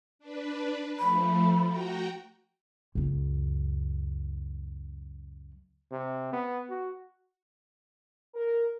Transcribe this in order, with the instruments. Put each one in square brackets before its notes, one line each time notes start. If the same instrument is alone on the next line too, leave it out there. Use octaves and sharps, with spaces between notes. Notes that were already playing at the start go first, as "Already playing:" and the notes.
[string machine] D4 B4
[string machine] F3 A3 [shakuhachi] B5
[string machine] F#4 G5 A#5
[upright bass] C#2 F#2
[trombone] C3
B3
F#4
[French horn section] A#4